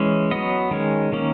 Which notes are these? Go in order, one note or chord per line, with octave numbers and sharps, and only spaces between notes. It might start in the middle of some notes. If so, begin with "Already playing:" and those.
Already playing: E3 G#3 C#4
F#3 B3 D#5
D#3 G#3 C#4
D#3 A#3 C#4